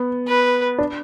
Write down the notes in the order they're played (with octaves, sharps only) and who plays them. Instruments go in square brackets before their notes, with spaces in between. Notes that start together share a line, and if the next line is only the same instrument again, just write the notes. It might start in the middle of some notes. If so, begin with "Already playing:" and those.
Already playing: [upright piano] B3
[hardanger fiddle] B4
[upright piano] D4